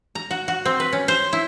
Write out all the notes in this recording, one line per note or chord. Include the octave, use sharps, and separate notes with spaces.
A#5
F#4
F#4
C4
B4
C#4
C5
E4